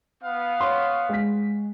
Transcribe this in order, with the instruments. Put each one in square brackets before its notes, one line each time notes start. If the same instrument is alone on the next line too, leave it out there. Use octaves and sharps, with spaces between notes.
[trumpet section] B3 F5
[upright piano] C#5 C6 C#6
G#3 B6